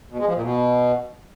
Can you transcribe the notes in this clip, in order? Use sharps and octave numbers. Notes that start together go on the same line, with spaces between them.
B2
G#3
F3
A#2
B2